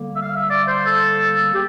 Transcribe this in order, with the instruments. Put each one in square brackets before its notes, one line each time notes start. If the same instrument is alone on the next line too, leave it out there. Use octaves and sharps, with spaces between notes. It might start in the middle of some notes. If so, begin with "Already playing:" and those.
Already playing: [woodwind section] D3 G3 A#3
E5
F5
E5
D5
C5
A4
G4